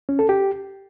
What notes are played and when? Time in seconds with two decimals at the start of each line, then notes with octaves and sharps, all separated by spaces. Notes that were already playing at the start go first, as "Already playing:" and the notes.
0.09 C#4
0.19 A4
0.29 G4